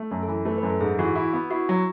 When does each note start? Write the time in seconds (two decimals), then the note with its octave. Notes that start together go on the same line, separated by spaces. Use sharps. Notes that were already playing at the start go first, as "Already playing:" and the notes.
Already playing: A3
0.11 F#2 A4
0.23 A4
0.28 E3
0.45 A3 B4
0.58 B4
0.63 F#2
0.70 A4
0.80 G#2 G#4
0.99 E3 F#4
1.16 E4
1.33 B3
1.51 E4 F#4
1.69 F#3